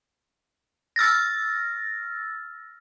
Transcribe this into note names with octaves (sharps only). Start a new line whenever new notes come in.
E6 F6 A6 A#6